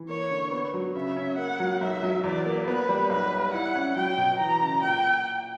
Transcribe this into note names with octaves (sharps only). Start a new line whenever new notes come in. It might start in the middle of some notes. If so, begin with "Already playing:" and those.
Already playing: E3
A#3 C#5
D3
B3
F#3
C#3 E5
C#4
A#3 F#5
F#3
B1 E5
F#3
E2 D5
A#3
B3 B4
G3
B1 B4
G3
E4 F#5
C#4
F#3 G5
B2
E3 A#5
C#3
A#2 G5